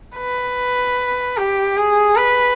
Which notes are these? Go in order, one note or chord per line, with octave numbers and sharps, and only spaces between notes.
B4
G4
G#4
B4